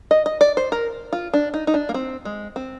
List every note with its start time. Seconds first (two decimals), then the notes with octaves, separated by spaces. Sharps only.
0.11 D#5
0.26 D#5
0.41 D5
0.57 C5
0.72 A#4
1.13 F4
1.33 D4
1.54 D#4
1.67 D#4
1.74 D4
1.89 A#3
1.94 C4
2.25 G#3
2.56 C4